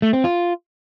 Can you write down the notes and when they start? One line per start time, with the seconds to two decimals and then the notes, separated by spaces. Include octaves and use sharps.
0.02 A3
0.13 C4
0.24 F4